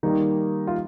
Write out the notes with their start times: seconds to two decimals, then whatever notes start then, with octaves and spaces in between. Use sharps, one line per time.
0.03 D#3 G3 A#3 D#4
0.67 F4